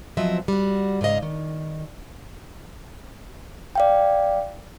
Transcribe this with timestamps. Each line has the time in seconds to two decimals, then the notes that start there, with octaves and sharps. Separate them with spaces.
0.17 E2 F3 F#3 C4 D#5 E5
0.48 G3 F#4
1.01 G#2 C#3 F#4 D#5 F5
1.22 D#3
3.75 D5 F5 G5